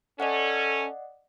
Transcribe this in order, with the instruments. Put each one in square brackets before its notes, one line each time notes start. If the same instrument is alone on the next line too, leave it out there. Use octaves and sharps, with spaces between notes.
[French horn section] C#4 A4 [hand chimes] D5 D#5 F#5